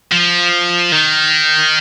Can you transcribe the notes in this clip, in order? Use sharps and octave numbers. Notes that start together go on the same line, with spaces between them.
F3
D#3